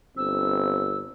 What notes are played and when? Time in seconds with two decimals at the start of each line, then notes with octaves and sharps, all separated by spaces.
0.17 G1 C4 E6